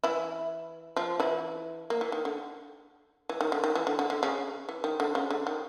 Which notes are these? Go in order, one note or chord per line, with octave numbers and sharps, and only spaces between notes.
E3 E4
F3 F4
E3 E4
A#3
E3
D#3
D3
E3
D#3
D3
D#3
E3
D3
D3
D3
C#3
E3
D#3
D3
C#3
D3
D#3